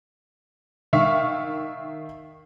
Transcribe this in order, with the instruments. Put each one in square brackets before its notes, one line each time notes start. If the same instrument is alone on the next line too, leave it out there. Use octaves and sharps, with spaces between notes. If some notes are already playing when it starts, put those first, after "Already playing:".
[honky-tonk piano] D#3 E5 F5 C#6